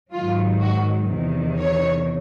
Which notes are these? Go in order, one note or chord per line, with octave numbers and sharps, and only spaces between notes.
G#2 D#3 F#3 F4
F#4
E2 C3 D#3
C#5